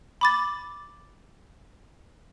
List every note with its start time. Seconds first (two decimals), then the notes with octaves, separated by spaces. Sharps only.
0.21 B5 D6 A6